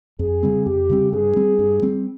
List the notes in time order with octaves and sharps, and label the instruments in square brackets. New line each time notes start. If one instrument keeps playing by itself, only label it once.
[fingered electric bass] F2 [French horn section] G#4
[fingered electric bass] C#3 G3 C4
[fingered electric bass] F2 [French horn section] G4
[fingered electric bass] C#3 G3 C4
[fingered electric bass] G2 [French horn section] G#4
[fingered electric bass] G3 C4
G2
G3 C4